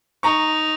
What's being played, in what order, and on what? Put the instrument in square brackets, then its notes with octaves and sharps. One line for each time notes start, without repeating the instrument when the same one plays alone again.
[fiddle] D#4 [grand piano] A#5 C#6